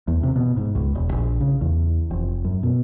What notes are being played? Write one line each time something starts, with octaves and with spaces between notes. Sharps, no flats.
E2
C3
B2
G#2
C#2
E1
A#1
C#3
E2
F1
F#2
B2